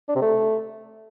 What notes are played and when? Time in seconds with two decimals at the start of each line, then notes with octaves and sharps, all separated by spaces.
0.09 D4
0.15 C3
0.22 A3